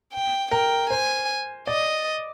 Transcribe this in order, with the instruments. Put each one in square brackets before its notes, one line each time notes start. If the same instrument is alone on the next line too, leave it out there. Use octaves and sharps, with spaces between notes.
[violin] G5
[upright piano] A#4 [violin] G5
[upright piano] C5 [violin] G#5
[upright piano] D5 [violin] D#5